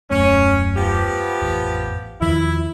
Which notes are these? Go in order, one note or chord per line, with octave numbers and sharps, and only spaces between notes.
D#1 F#2 A3 C#4
F3 B3 G4
A1 F2
E2 D#3 F3 E4